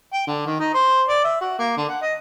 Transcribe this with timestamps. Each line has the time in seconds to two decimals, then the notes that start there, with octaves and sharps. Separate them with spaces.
0.13 G5
0.27 D3
0.46 D#3
0.59 D#4
0.74 C5
1.09 D5
1.24 E5
1.41 F#4
1.59 A#3
1.77 D3
1.89 F#5
2.01 D#5